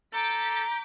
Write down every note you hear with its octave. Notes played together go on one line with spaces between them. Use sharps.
A4 A#5 D6 G6 B6